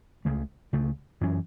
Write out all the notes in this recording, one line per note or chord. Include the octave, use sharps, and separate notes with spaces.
C#2 C#3 A3
C#2 C#3 A3
F#2 E3 C#4